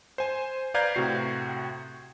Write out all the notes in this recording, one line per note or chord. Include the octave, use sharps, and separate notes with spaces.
C5 G#5
B4 D5 F5 A#5 G6 G#6
A2 C3 F#4 C7